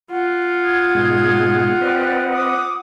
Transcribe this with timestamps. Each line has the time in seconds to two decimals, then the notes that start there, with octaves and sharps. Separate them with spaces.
0.12 F4 F#5
0.63 D#6 G#6
0.95 G#2 B2 G#3
1.81 C4 G4 B4 D5 D#5 F#6
2.32 D6 D#6